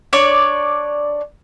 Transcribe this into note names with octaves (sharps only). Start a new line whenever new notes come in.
D4 C#5 D5